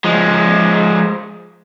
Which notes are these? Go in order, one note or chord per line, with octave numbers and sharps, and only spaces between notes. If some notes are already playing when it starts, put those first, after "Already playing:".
F3 G#3